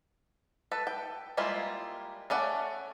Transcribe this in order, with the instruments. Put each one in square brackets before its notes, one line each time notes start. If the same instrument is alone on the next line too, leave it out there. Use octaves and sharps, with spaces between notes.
[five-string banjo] A4 B4
G5
G3 G#3 A#3 E4 F4
A3 C#4 D5 F#5